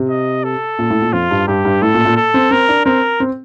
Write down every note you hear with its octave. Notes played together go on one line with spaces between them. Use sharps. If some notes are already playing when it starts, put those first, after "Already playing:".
Already playing: C3
D#5
A4
A#2
A2
A#2
F2 F4
G2
G2 G4
G2
A2 A4
A#2
A#2
A4
C4
C4 A#4
D4
C4 A#4
C4